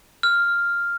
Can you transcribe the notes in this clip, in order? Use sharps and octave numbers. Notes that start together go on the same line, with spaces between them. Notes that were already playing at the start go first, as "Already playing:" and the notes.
F6